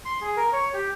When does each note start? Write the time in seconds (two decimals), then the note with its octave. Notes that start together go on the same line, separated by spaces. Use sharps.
0.05 C6
0.21 G#4
0.37 A#4
0.53 C#5
0.74 G4